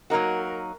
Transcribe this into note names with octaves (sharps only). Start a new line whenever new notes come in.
F#3 A#3 D#4 F#4 A#4